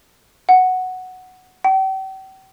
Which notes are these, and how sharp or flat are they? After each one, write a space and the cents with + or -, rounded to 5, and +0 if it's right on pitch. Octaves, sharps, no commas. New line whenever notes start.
F#5 +0
G5 -40